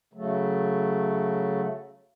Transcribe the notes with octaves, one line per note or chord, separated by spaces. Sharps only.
C#3 F#3 A3